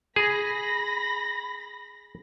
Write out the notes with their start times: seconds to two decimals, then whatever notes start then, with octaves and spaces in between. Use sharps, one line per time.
0.16 G#4 B5 A#6